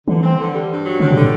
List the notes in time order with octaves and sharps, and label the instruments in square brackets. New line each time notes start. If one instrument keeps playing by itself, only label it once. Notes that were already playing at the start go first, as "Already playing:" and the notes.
[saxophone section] D3 [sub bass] E3
[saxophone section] C4
D3
G3
G2
F#3
[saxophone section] G2 [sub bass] D3
[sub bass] B2
[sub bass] A2 [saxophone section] D3